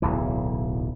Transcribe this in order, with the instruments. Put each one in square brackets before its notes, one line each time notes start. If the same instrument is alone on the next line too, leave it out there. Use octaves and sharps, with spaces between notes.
[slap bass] D1 B1 E3